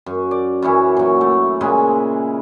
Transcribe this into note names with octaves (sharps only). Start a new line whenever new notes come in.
F#2
D5
F#2 E3 C#4 E4
A#2 F#3
A3
A#2 C#3 G#3 E4